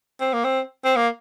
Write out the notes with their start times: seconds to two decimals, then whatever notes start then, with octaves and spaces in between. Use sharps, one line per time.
0.20 C4
0.33 A#3
0.44 C4
0.85 C4
0.96 A#3